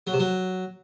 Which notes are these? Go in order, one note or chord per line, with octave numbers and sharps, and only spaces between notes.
F#3
C3
F#3